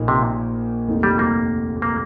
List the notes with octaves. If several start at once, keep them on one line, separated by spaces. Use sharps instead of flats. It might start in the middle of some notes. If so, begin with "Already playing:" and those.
Already playing: A#1 A#2 A#3 D#4
C3
F1 D#2 D#3
G3
A#3
A#3